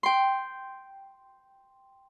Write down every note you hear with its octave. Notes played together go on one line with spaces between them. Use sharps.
G5 C6